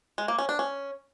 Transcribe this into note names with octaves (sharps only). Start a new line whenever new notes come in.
G#3
A#3
C#4
D4
C#4